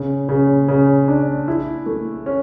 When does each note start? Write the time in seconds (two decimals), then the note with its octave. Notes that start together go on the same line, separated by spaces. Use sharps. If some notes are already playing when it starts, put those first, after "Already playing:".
Already playing: C#3
0.29 C#3
0.68 C#3
1.08 D4
1.48 E4
1.86 A3
2.26 C#4